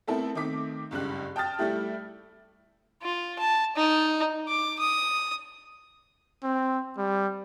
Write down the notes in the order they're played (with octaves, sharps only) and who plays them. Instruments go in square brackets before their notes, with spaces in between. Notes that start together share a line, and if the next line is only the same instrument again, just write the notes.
[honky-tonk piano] A3 B3 C4 E4 A4 A#4
D#3 A3 C4 D6 B6
F#1 C#2 G2 F#6
G5 A5 D#6 F6 A6
G3 A3 E4 G4
[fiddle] F4
A5
D#4
D6
D#6
[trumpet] C4
G3